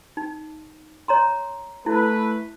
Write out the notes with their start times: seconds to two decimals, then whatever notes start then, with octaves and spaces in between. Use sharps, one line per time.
0.17 D#4
1.08 C#5 A#5 C6
1.86 A3 E4 A4 B4